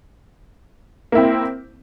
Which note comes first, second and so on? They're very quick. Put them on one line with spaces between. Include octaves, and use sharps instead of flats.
A#3 E4 C4